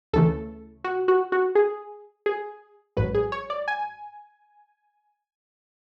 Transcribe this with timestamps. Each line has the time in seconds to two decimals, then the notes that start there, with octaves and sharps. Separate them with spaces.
0.13 D2 C#3 E3 A3 A4
0.84 F#4
1.08 F#4
1.32 F#4
1.55 G#4
2.26 G#4
2.97 A1 G#2 F#3 B4
3.14 G#4
3.32 C#5
3.50 D5
3.68 G#5